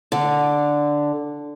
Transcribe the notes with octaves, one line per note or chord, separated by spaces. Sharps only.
D3